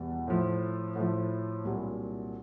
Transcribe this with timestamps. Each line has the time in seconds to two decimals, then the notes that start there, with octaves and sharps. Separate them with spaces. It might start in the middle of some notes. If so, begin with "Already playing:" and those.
Already playing: E2 B2 G3
0.28 A2 F3
0.96 A2 F3
1.65 C2 A#2 F#3